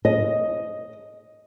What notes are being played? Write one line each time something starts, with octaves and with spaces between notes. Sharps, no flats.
D#5